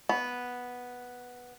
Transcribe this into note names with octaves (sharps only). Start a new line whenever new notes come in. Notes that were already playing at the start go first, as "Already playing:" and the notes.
B3